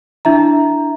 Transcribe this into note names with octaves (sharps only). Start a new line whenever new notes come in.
D4 E4 E5 A#5